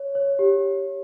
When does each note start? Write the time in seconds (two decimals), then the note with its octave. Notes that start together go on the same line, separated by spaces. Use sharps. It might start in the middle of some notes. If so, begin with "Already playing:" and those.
Already playing: C#5
0.15 C#5
0.39 G4